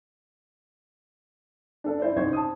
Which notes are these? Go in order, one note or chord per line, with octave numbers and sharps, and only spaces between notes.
D4 A4
E4 C5 D5
C2 C#4 D#4 C5 C#6 G#6
A5 D#6